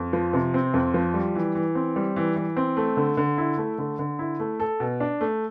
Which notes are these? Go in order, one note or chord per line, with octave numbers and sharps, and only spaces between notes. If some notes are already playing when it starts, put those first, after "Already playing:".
Already playing: F2
F3
C3
C4
F2
F3
G3
E3
E3
C4
G3
E3
E3
C4
A3
D3
D3
E4
A3
D3
D3
E4
A3
A4
B2
D4
A3